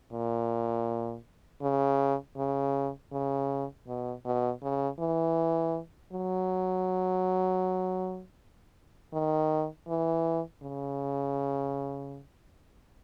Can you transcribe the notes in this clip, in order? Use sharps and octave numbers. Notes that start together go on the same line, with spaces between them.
A#2
C#3
C#3
C#3
B2
B2
C#3
E3
F#3
D#3
E3
C#3